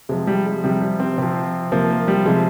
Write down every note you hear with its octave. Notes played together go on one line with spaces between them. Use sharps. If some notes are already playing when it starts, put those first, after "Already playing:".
C3 F3 G#3
G3
G#3
C3 F3 G3
G3
C4
C3 F3 C4
C3 F3 A#3
A#3
G3
C3 F3 G#3